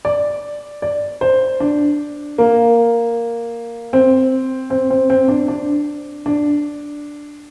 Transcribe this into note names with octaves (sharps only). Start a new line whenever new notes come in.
D5
D5
C5
D4
A#3
C4
C4
C4
C4
D4
D4
D4